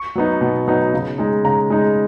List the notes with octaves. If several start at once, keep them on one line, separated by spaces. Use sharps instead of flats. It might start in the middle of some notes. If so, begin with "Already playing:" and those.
Already playing: C#6
F#3 B3 D#4
B2
F#3 B3 D#4
C#3
G#3 D#4
C#3 A#5
G#3 D#4